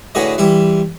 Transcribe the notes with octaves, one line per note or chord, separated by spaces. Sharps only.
A2 D3 F#4 G#4 B4 D#5
E3 G3 E4 C6